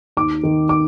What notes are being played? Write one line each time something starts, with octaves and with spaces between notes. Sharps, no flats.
D#2 D6
D#3
D6